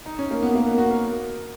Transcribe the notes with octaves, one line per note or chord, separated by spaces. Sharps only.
D#4
C#4
A#3
B3
A#3
B3
F#4
A#4